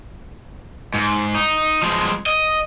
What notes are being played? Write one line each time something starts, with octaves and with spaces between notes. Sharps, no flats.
G#2
D#4
F3 G#3
D#5